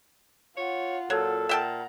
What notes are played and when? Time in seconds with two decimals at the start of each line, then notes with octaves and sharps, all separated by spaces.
0.57 F4 C#5 F#5
1.10 A#2 F#3 A4
1.49 A#2 E5 F#5 G5 A5 A#5